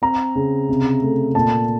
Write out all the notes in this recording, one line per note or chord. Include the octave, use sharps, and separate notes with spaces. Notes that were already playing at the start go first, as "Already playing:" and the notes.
C4 A#5
C#3
C3
A3
A#2 A5